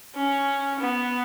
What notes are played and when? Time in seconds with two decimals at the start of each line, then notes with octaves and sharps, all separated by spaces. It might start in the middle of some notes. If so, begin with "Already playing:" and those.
0.15 C#4
0.79 B3